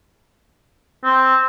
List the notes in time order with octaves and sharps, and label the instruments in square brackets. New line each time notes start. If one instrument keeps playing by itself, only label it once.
[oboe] C4